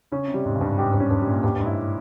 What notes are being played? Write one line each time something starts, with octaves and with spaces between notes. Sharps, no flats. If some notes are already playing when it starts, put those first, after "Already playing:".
C#3 C#4
C3
G3
G#2
C#3
G2
G#2 G4
G2
C#4
G2
G3
A#2
G2 G4
G2
G#2
E4